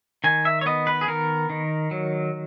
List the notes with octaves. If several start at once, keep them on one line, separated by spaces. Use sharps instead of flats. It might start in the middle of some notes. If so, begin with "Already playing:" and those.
D#3 G#5
E5
C#5
B3 D#5
B4
G#4
D#3 A#4
D#3
F#3